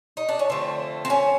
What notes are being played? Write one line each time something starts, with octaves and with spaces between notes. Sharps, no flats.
D#4
D4
C#4
D3 F3 A3 C4
C4
C#4